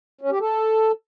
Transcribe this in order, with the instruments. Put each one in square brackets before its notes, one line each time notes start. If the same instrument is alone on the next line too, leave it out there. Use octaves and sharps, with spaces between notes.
[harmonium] C#4
G4
A4